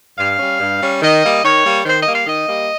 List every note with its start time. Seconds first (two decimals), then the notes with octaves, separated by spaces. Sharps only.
0.18 G2 F5
0.39 G3 C#4
0.60 G2
0.81 G3 C#4
1.02 D#3 D#5
1.22 G3 A#3
1.43 D#3 C#5
1.64 G3 A#3
1.85 D#3 C5
1.99 D#5
2.06 G3 A#3
2.13 F5
2.27 D#3 D#5
2.48 G3 A#3